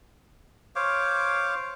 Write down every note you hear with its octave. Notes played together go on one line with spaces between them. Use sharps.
C5 C#5 F5 D6